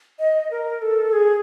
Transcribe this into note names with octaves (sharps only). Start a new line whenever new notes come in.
D#5
A#4
A4
G#4